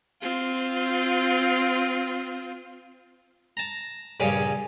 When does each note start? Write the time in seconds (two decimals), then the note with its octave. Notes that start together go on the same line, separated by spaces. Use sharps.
0.21 C4 F4
3.57 A5 A#5
4.20 A#1 G2 C#3 C#4 C#5 F5